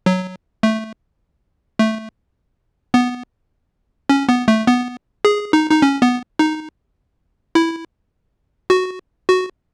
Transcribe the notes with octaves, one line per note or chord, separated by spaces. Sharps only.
F#3
A3
A3
B3
C#4
B3
A3
B3
G#4
D#4
D#4
C#4
B3
D#4
E4
F#4
F#4